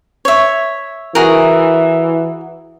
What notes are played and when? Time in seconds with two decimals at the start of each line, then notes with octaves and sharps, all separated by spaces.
0.25 C#5 E5
1.15 E3 F#4 G#4 A#4